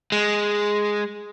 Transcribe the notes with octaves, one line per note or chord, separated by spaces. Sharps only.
G#3